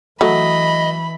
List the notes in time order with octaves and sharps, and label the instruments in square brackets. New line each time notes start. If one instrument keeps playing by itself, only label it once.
[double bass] E3 [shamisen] F#3 A3 [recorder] D#5 [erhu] B5